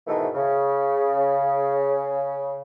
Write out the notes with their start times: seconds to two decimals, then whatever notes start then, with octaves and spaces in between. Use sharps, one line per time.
0.07 G#2 B2 D#3 E3 A3
0.35 C#3